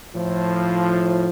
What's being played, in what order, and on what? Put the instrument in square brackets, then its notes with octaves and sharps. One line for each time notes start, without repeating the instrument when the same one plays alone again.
[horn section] A2 F3